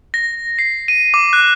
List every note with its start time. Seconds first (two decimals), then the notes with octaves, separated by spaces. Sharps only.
0.14 A#6
0.59 C7
0.88 D#7
1.14 D6
1.33 F#6